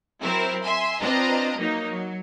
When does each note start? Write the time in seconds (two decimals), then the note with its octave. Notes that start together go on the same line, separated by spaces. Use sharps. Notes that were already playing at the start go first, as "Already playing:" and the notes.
0.21 F#3 C4 E4 A#4 C5
0.63 E5 G#5 C6
1.01 C4 D4 F4 B4 D#5 A#5
1.57 F#3 A#3 D#4
1.89 F#3